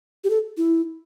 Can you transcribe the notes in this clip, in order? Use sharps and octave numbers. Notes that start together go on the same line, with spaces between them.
G4
A4
E4